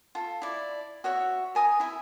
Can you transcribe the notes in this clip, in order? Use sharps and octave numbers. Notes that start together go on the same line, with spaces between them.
F4 A4
E4 D5
F#4 C#5 E5
A#4 G#5 D#6
E4 E5